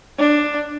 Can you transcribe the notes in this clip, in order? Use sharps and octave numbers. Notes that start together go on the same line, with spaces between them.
D4